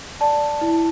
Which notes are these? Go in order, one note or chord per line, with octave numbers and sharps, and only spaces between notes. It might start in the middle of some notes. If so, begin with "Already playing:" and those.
D5 A5
E4